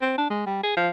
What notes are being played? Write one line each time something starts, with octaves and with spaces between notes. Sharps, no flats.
C4
D4
G#3
G3
G#4
F3